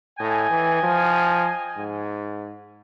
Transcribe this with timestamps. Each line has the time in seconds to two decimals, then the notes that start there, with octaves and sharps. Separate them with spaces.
0.20 A2 D#5 G5 G#5
0.50 E3
0.83 F3
1.77 G#2